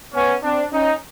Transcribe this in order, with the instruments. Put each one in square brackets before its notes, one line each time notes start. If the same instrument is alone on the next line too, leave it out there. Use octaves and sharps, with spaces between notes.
[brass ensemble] B3 C#4
C4 D4
C#4 D#4